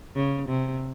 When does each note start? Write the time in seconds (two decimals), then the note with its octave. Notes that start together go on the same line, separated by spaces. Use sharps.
0.15 C#3
0.48 C3